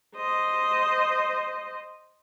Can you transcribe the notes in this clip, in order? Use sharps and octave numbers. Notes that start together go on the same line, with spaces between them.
C5 D#5